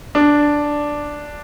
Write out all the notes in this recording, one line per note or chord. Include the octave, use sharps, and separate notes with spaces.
D4